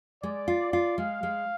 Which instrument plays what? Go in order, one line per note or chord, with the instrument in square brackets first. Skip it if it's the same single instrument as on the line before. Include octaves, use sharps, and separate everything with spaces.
[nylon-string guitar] G#3 [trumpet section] D5
[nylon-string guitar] F4
F4
[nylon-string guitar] G#3 [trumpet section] F5
[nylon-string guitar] G#3